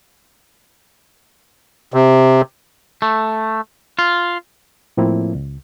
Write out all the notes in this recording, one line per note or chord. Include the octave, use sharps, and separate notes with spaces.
C3
A3
F4
A2 F3 A#3 C4 E4
C#2